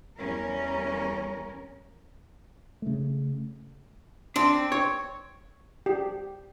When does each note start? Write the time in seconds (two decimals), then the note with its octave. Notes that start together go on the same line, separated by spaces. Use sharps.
0.16 E2 G3 C#4 A#4
2.82 C#3 A3
4.36 C4 D4
4.72 C#5
5.86 G4